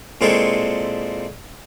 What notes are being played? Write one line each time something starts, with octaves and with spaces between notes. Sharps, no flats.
A#2 G#3 C4 E4 A4 C#6